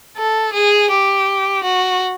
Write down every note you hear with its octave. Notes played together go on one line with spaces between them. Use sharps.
A4
G#4
G4
F#4